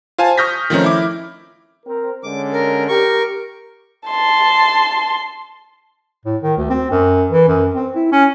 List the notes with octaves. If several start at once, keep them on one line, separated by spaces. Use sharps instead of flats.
F4 C5 F5 G#5 A5
C#6 D#6 F6 G6 A#6 B6
D#3 F3 A3 C4 C#4 D#4
E4 D6
C4 A#4
D3 G#3 C#4 D6
A#4
G4 A#4 C#6
A5 C6
A2
D#3
D2
C4
F#2
E3
F#2
C4
E4
C#4